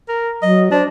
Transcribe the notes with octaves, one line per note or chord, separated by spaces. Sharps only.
A#4
F#3 D#5
D4 C5